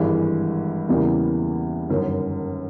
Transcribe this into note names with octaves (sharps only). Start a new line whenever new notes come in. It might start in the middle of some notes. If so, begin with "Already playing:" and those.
Already playing: G#1 G2 E3 G#3
E2 C#3 E3 G3 A#3
G1 F#2 D#3